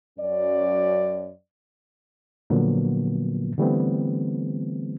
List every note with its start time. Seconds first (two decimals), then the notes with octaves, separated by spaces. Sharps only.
0.18 F#2 F#3 C#4 D5
2.50 A#2 D3 F3 F#3 A#3 B3
3.58 D3 E3 G3 A3 B3 C4